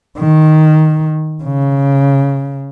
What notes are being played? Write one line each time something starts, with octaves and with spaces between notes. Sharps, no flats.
D#3
C#3